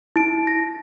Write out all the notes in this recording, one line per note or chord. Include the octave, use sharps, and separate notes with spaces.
E4 D7
A#6